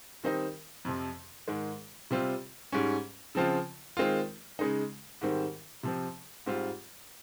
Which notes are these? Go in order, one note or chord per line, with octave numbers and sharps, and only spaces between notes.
D#3 G3 C4 D#4
F2 C3 F3
G#2 D#3 G#3
C3 G3 C4 F4
G#2 G3 C#4
C#3 F3 C4 F4
D#3 G#3 C4 F4
C#3 G#3 D#4
G#2 D#3 G3 C4
C3 F3 C4
G#2 G3 C4 F4